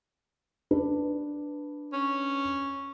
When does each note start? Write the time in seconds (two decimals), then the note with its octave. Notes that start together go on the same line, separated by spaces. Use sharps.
0.71 D4 B4
1.93 C#4